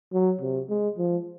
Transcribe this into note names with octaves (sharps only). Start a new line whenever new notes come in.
F#3
C3
G#3
F3